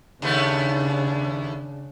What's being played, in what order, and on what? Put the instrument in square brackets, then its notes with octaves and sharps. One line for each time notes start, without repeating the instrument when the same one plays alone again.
[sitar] D#2 A3 B3 [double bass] C#3 D4